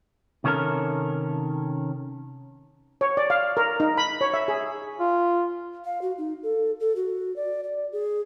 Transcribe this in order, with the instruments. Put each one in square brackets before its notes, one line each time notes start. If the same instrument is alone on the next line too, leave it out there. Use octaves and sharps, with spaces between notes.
[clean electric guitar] C3 D#3 C#4 A4 A#4
[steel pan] C#5
D5
F5
A#4
D#4
B5
C#5
E5
G#4
[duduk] F4
[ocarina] F5
F#4
D#4
A4
A4
F#4
D5
D5
G#4